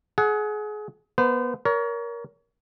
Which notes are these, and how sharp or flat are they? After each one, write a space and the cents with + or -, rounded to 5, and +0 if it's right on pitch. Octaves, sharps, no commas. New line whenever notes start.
G#4 +30 F#5 +0
B3 -30 C5 -40
A#4 +15 C#5 +35